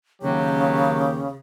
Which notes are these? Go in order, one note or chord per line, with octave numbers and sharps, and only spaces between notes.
D#2 C#3 F#3 G4